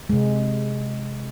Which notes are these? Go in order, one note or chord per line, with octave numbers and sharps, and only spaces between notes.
C3 G#3